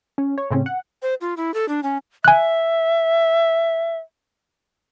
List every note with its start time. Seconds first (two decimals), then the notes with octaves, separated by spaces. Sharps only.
0.18 C#4
0.38 C#5
0.51 A2 C#3 C4 C#4
0.66 F#5
1.02 C5
1.21 F4
1.37 E4
1.54 A4
1.69 D4
1.83 C#4
2.24 E5 G#5 F#6